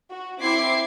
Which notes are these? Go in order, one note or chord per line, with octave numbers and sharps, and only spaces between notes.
F#4
C4 E4 C6 D6 G#6 C7